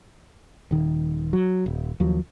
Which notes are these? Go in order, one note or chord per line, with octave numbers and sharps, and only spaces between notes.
D#1 D#3
F#3
D#1
D#2 F3 F#3